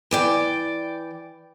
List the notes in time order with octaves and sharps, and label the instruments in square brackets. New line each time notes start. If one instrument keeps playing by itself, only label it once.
[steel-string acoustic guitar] E3 D5 G5